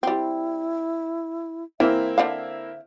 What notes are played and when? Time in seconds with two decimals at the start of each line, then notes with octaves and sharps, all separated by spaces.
0.03 G3 C4 E4
1.80 E3 A#3 C4 E4 E5
2.18 D3 C5 E5 F5